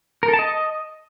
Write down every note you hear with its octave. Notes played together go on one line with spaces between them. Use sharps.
A#4
A4
A5
D#5